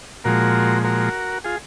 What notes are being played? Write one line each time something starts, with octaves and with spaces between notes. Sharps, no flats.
A#2 F3 G#3 F#4 A#4
F#4 A#4
F4 G#4